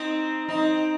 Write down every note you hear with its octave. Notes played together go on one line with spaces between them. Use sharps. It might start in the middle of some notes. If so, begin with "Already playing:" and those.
Already playing: C4 D#4
C4 D#4